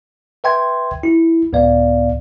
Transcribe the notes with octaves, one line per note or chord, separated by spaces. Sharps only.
B4 E5 G5 C6 G#6
E4
C#2 A2 B3 D5 F5